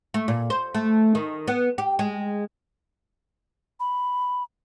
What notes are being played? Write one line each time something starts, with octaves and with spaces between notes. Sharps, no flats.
A3
A#2
C5
A3
D#3
B3
G4
G#3
B5